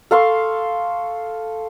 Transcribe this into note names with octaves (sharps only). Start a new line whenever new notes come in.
A4 F5 C6 C#6